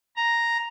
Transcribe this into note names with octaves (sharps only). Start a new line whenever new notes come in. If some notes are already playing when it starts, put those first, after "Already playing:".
A#5